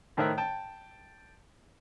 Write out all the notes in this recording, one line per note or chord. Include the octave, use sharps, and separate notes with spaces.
A2 D#3 A#4 C5 E5 F#6
G5 A5